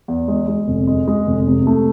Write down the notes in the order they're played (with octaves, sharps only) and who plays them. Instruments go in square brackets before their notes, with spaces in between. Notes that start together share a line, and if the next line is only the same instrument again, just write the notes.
[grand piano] E2
G#3
G#3
F1
G#3
G#3
F1
C3
A3